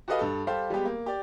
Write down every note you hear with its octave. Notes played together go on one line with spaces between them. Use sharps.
F#4 G4 A4 B4 D#5 F5
G2 A4
G3 G4 A4 C5 F5
G3 G#3 B3 G4
A#3
G4 D5